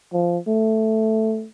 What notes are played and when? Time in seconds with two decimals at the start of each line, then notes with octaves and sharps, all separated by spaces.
0.13 F3
0.48 A3